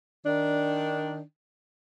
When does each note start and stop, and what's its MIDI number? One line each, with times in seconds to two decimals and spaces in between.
0.25 1.21 51
0.25 1.21 62